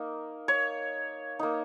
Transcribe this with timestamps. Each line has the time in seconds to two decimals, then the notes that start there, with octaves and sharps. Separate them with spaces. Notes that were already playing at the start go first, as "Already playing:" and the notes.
Already playing: A#3 D#4
0.48 C#5
1.39 A#3 D#4